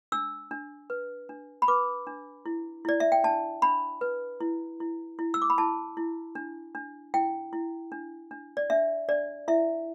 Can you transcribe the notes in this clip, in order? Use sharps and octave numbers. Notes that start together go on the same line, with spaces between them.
D4 E6
D4
B4
D4
B5
B4 D6
D4
E4
E4 D5
E5
G5
D4 A5
D4 B5
B4
E4
E4
E4
E6
D6
B5
E4 A5
E4
D4
D4
E4 G5
E4
D4
D4
D5
D4 E5
D4 D5
E4 E5